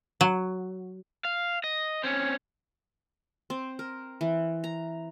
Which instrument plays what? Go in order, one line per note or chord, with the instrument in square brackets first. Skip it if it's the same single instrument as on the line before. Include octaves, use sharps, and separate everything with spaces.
[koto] F#3
[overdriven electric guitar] F5
D#5
C4 C#4
[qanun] C4
A#4
E3
A#5